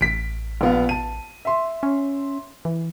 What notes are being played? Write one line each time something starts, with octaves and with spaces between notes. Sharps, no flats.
A1 B6 D7
A#1 B3 F5
A5 D#7
E5 C6
C#4
E3